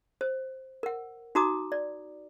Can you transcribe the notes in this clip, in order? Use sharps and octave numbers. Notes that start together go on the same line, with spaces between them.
C5
A#4 F#5
D#4 F#4 A#5 D6 D#6
D5